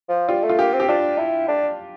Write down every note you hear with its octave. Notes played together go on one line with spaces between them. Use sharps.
F3
G3 F4
A3
F4
A#3 G4
C4
G4
D4 F4
E4
D4